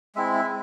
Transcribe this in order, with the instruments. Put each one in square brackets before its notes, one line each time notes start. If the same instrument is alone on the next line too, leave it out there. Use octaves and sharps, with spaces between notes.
[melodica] G#3 C4 E4 E5
E5